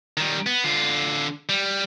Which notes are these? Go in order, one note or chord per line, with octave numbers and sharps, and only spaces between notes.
D#3 G3
B3
D3 F4
G3